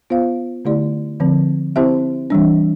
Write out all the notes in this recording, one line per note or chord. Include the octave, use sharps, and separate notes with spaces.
B3 F4 C5 F5
D3 A3 E4 G4 D5
D3 F3 C4
C4 E4 G4 C5 E5
E3 G3 D4